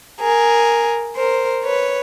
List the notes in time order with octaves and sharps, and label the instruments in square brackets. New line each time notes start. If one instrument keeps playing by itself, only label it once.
[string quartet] G#4 A#4
A#4 C5
B4 C#5